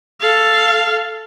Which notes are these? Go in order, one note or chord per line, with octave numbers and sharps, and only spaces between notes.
A4 F5